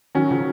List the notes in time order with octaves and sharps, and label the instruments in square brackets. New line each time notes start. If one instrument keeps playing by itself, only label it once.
[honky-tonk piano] D#3 F#3 [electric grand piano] C#4
[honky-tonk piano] C#3 F3